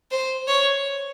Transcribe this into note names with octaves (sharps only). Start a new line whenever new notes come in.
C5
C#5